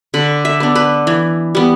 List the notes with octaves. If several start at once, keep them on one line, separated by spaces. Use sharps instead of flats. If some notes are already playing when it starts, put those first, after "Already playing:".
D3 B5
E5
B3 D4
B4
E3
G3 B3